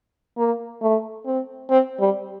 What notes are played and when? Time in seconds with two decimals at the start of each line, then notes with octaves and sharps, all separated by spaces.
0.37 A#3
0.82 A3
1.26 C4
1.70 C4
2.00 G3